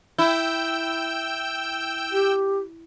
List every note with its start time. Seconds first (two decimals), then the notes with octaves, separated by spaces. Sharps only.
0.18 E4 G5 E6 G6
2.12 G4